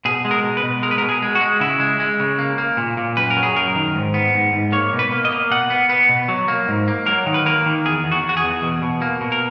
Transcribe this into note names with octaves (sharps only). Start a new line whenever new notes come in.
B2 G#4
G#3
A#4
B2
B4
B2
G#3 A#4
B4
A#4
B2
G#4
G#3
F#4
G#3
C#3 E4
G#3
G#3
C#3
A#3
A#3
A#2
A#2
F#2 B4
A#4
F#3
G#4
F#2 A#4
D#3
G#2
B3
G#2
G#2
A#3 C#5
B2
B4
A#3
D#5
A#3
B2 F#5
B3
B3
B2
F#3
A#3
G#2
A#3
F#3 A#4
D#3
B4
A#3 A#4
D#3
E2 G#4
E2
F#4
E2
F#4
G#4
E2
B2
B2
A#3
B2
A#4